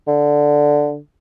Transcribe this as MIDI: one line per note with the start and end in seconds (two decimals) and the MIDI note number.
0.07 0.97 50